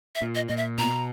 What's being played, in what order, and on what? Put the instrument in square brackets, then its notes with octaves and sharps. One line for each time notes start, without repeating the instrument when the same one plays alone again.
[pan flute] E5
[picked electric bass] A#2
[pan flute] D#5
[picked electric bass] A#2 [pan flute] D#5
[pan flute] E5
[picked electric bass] B2 [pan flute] A#5